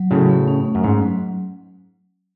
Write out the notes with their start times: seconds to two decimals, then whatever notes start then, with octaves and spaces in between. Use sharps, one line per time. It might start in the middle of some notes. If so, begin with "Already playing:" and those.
Already playing: F#3
0.10 A2 C#3 F#4
0.29 A3
0.48 C#4
0.65 A3
0.75 F#2
0.84 G#2 C#4
1.02 F#3